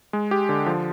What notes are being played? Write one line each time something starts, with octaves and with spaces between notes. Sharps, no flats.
G#3
G4
D3
F3